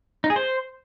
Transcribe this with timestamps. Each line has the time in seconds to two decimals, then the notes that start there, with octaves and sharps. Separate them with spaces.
0.24 D#4
0.30 G#4
0.36 C5